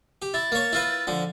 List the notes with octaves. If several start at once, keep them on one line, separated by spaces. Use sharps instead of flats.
G4
E4 A6
A#3 C#5
E4 F4 B4
D3 F3